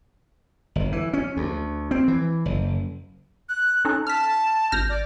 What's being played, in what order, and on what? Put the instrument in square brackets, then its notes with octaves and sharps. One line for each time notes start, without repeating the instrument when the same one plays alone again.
[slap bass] G1
E3
C#4
D2
C4
E3
F#1
[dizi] F#6
[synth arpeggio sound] C#4 D#4 A4
[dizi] A5 [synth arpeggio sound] F6 B6
[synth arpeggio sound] G#1 F6 A#6 [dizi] G6
[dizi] D5